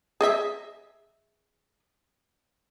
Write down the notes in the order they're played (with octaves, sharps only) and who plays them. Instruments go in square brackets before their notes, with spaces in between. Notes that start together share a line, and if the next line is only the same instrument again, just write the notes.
[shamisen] G#4 D#5 E5